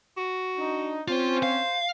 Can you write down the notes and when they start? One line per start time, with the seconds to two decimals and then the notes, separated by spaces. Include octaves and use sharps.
0.17 F#4
0.58 D4 D#4
1.08 C4 C#4 F4 C5
1.43 F5